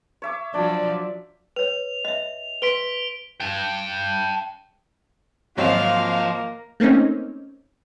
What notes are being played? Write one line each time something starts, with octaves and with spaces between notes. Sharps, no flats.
C#5 E5 D6
F3 F#3 D4 D5
B4 C#5 F7
D#5 E5
B4 C6 B6 D7 G7
G5 A5
G#1 F3 F#3 A#3 C4 F5
A3 A#3 C4 C#4 D#4